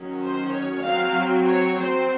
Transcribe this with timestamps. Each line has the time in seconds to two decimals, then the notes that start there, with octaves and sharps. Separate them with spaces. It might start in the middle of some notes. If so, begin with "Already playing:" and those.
Already playing: D#3 F#3 C#4
0.22 C5
0.53 C#5
0.84 F#3 C4 F5
1.47 C#5
1.77 F#3 C4 C5